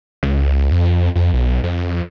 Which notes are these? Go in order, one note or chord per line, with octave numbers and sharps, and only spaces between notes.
C#2
F2
F2
B1
F2